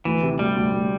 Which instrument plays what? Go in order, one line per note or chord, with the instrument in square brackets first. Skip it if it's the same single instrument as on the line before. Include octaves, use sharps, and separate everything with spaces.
[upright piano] D2 [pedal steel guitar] E3
[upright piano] C3
[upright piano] D2 [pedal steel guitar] G3
[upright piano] D2
D2